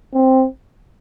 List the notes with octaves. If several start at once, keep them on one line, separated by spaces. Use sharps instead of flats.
C4